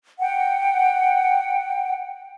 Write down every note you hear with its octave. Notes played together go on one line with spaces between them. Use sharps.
F#5 G5